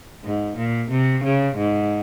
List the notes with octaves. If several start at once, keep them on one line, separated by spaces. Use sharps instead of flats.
G#2
A#2
C3
C#3
G#2